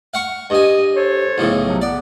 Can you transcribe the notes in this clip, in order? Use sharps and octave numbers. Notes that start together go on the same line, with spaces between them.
F5 F#5 C#6
G2 D#5 G#5
A4 C5 C#5
B1 A2 C#3
C3 F3 F#3
B3 D5